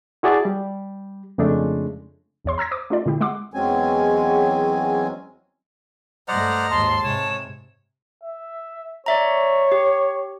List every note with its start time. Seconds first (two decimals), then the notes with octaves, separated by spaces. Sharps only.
0.23 E4 F#4 G#4 D5 E5 A5
0.45 G3
1.38 F2 C#3 G#3 A3 D4
2.44 G#1 E2 C#5 C6
2.58 A#5 E6 G#6 A#6
2.71 C5 D6 D#6
2.90 A3 C#4 D#4 F4 A4 D5
3.06 A#2 D3 G#3 E4 G4
3.21 G#3 F#5 C6 D6
3.54 E2 F#3 G#3 C4 C#4 G#5
6.28 G2 A3 C5 D5 D#5 F#5 A#5 F6
6.71 D#2 G#2 A5 C6
7.04 G#2 C3 C#5 E7
8.24 E5
9.06 C#5 D5 E5 A#5
9.72 G4